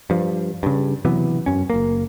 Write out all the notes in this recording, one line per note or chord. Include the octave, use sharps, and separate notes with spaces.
G2 F3
G2 C#3
C3 E3 F#3 B3
F#2 C#4
F#1 A#3